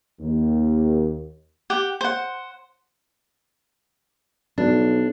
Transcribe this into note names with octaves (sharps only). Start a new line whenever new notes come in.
D#2
G4 F#5
C5 F#5
B1 D4